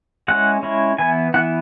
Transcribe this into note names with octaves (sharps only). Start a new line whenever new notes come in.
G#3 C#4 E4 F#5
G#3 C#4 E4
E3 B3 E4 G#5
E3 B3 E4 F#5